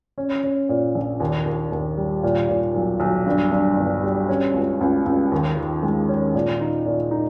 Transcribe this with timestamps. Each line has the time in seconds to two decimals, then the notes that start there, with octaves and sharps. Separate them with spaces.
0.18 C#4
0.44 C#4
0.69 A#2
0.95 A#1
1.20 D#2
1.46 D#2
1.72 D#2
1.97 G3
2.23 A#2
2.49 A#2
2.74 B1
3.00 B1
3.26 G2
3.51 G2
3.77 G1
4.03 G3
4.29 C#4
4.54 C#2
4.81 C#2
5.06 C#2
5.32 D#2
5.57 D#3
5.83 G#3
6.09 C#4
6.34 A#2
6.61 D#4
6.86 A#2
7.11 D#4